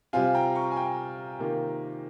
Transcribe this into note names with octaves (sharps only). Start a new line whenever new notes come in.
C3 G3 C4 F4 F5 G#5
G5 A#5
A#5 C#6
G#5
G5 A#5
C3 D#3 A#3 F4